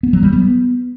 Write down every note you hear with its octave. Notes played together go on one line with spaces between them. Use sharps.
B3
F#3
G3
B3